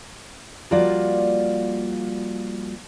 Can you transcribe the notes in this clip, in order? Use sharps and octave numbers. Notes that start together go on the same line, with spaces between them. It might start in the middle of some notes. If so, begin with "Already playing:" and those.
F3 G3 A#3 F4 F#4 D5